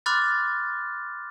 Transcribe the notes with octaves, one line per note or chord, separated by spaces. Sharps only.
B5 C6 D6 F6 F#6 A6